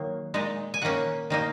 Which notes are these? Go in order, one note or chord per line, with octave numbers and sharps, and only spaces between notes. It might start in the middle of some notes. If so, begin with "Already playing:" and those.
Already playing: D#3 F#3 A#3
A#2 G#3 D#4
G#5
D#3 A#3 C#4 F#5
D#3 A#3 D#4